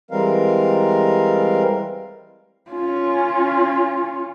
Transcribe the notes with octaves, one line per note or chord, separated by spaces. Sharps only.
E3 G3 G#3 C4 A#4 F5
C#4 F4